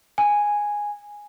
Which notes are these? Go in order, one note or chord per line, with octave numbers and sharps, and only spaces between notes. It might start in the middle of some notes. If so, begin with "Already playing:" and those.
G#5